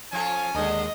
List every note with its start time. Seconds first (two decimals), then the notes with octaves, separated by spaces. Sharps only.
0.12 F3 C#4 F4 A4 G#5
0.55 D#2 D3 G#3 D#5